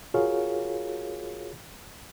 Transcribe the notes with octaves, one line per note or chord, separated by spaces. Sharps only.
F4 F#4 G#4 A#4 C#5 F5